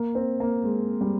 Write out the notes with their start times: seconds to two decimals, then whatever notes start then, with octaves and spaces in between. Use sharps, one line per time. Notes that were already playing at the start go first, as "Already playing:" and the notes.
Already playing: A#3
0.15 C4
0.40 A#3
0.64 G#3
1.01 G3